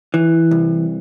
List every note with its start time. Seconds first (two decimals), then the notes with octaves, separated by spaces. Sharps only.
0.14 E3
0.51 C2